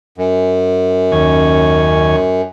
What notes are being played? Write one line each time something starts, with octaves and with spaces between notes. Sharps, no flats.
F#2
D#2 C#4 G#5